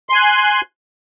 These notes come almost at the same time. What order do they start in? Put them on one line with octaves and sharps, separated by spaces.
C6 G#5 F#6